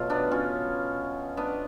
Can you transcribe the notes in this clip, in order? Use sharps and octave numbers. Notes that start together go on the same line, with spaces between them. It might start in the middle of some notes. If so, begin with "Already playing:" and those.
Already playing: B2 F#3 A3 F4
B3 D4
C#4 F4
B3 D4